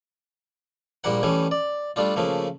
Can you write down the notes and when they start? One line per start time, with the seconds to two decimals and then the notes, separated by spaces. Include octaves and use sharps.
1.04 A#1 G3 A#3 A#4 F#5
1.23 E3 G3 A3 C#4
1.51 D5
1.96 G3 A3 D4 F4
2.16 C#3 F3 A3 A#3